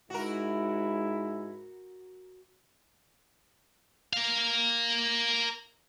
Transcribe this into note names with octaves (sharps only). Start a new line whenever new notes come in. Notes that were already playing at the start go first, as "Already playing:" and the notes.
G#2 E4 F#4 A#4
A#4 F5